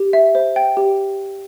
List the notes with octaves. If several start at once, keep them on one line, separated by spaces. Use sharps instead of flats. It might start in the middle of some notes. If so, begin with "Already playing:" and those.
Already playing: G4
E5
C5
G5
G4